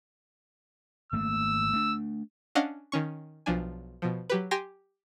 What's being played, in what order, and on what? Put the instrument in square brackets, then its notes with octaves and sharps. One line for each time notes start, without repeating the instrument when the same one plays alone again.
[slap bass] G#1 A3 A#3 [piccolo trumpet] E6
[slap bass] A3 D4
[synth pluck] C#4 D4 D#5 F5 F#5
D#3 C#4 C#6
B1 F3 D4 G#5
B2 F3
F#3 G4 B4
G4 G5 G#5 C6 A#6